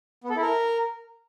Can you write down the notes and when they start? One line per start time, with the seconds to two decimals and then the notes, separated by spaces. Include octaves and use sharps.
0.24 B3
0.30 A4
0.36 E4
0.42 A#4